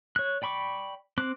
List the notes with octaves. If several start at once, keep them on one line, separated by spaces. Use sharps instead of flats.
C#5 F#6
D5 G5 B5 C#6 D6
C4 D6 F#6